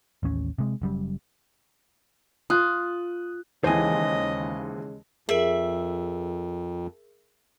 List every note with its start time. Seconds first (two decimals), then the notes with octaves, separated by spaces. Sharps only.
0.23 A1 D#2 C#4
0.58 C3 G#3
0.82 F#1 F#2 G3
2.50 F4 D#6 F#6
3.64 D#2 C#3 E3 G#3 C5 D#5 G#5
5.29 F2 G#4 A#4 E5